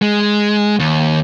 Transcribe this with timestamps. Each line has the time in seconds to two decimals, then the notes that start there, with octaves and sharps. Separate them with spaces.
0.02 G#3
0.79 D#2